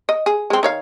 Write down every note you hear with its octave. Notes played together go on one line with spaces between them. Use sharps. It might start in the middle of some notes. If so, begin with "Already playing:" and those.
D#5
G#4
G#3 C4
D#3 C#5 F5